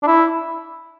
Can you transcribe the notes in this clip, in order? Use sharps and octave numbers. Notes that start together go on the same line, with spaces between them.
D4
E4